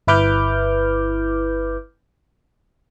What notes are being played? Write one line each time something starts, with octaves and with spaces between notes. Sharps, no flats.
G1 E4 B4 D6 F6 G6